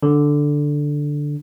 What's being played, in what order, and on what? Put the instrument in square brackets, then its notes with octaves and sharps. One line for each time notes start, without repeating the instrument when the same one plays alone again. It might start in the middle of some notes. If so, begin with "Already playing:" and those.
[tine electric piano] D3